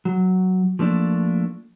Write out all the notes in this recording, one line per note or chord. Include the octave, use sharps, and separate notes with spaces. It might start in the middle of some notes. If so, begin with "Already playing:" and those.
F#3
F3 A3 A#3 D4